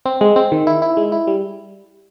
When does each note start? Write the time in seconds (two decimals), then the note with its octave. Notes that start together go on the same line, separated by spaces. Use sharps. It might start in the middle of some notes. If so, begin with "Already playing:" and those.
0.06 C4
0.21 G#3
0.36 C4
0.52 D#3
0.67 E4
0.82 E4
0.97 G#3
1.12 E4
1.27 G3